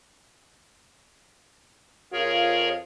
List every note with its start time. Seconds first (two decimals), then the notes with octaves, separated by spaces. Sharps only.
2.13 F2 F4 G#4 A#4 C#5